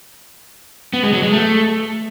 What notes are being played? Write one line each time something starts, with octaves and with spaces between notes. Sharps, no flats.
B3
G#3
F#3
G#3
A3